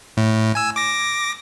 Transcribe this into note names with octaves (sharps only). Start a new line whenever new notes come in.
A2
G#5 E6
D6 A#6